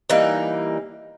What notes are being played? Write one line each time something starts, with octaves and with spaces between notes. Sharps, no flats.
E3 G3 A#3 D#4